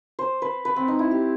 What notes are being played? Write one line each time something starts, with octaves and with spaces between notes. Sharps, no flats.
C5
B4
B4
C4
D#4
E4
G4